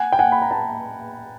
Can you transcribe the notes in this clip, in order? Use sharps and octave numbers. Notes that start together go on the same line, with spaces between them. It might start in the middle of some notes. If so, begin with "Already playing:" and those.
Already playing: F#5 G#5
G5
F#5 G#5
B5
A#5
G5 A5